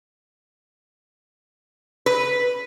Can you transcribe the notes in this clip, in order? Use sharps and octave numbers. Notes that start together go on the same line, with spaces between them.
B4